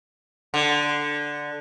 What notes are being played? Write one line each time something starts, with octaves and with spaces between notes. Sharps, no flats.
D3